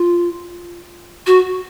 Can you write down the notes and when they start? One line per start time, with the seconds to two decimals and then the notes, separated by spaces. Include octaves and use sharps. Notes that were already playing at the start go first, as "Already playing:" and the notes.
Already playing: F4
1.27 F#4